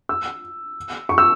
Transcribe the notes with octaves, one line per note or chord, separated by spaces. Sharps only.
E6
C#6
E6